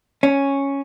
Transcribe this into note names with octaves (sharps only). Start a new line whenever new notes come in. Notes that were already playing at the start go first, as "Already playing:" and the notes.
C#4